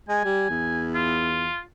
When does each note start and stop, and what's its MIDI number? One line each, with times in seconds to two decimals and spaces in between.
0.09 0.20 56
0.09 0.86 80
0.25 0.47 55
0.50 1.52 40
0.94 1.61 65